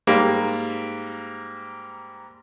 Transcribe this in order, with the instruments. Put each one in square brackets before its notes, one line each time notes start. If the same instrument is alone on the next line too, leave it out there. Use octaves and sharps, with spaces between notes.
[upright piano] G#2 G3 A#3